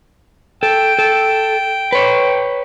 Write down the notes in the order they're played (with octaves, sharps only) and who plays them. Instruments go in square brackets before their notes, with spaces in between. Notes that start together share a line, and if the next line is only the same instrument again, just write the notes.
[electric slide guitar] A4 [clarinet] G5
[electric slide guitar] A4
B4 C#5